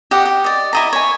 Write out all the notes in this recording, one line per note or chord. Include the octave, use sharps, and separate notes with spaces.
G4 D#5 F#5
G4
D5 D#5
E4 D#5 A#5
C#5 G#5